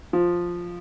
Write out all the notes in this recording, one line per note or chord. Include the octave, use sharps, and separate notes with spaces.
F3